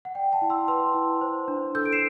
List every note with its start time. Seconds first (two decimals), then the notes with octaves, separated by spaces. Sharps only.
0.05 F#5
0.15 D5 G5
0.32 F#5 A5
0.42 E4
0.50 C6 E6
0.68 B4 C6 E6
0.94 E4
1.21 C5
1.48 D4
1.75 A4 E6 G6
1.85 D7
1.92 C7 E7